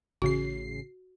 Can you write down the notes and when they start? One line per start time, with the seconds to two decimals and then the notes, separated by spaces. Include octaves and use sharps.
0.22 A1 C#3 F#4 C7